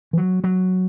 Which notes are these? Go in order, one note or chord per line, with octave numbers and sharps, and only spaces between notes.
E3
F#3
F#3